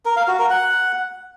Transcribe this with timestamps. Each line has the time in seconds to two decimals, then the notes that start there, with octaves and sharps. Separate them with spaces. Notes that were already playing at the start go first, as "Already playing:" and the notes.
0.05 A#4
0.16 F5
0.28 F#4
0.39 A#4
0.50 F#5